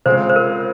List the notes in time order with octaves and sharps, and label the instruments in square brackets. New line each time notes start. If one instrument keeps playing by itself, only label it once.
[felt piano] C#3 G#3 C4 F4 [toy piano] C5
[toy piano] C5
A#4